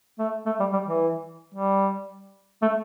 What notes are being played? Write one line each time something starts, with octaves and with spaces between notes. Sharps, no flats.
A3
A3
G3
G3
E3
G3
A3